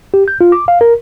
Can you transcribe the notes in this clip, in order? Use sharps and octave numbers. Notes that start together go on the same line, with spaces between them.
G4
G6
F4
D6
F5
A#4